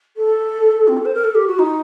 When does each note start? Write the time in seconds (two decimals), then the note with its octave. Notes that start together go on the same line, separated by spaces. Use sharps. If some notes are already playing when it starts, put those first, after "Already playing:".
0.16 A4
0.87 C4
0.97 A4
1.05 C5
1.14 A#4
1.24 A4
1.34 G4
1.47 F#4
1.58 D#4